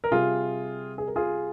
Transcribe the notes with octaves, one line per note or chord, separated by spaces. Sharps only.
A#4
C3 G3 F4 G#4
G#4
A#4
F4 G#4